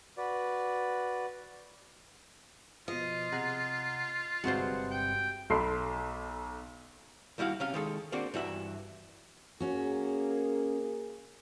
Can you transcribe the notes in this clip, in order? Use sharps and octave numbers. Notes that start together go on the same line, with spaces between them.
F#4 B4 D5
B2 F3 F4 D#5
C3 G#4 F#5 A#5
G1 G2 C3 G#3 F#4 C5 C#7
G5
B1 A4 B5 C6 C7
D#2 G3 E4 F#4 F5
C3 C#4 F5
D#3 G#3 A4
A#3 C4 D4 F#4
G2 E3 F#4 E5
A#3 C#4 F#4 G#4